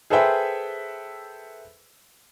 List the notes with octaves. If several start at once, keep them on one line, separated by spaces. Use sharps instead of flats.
G#4 A4 B4 C5 E5 G5